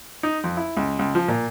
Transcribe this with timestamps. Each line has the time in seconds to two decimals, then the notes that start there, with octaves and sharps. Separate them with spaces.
0.23 D#4
0.44 F2
0.57 E4
0.77 C#2
0.99 C#2
1.15 F3
1.28 A#2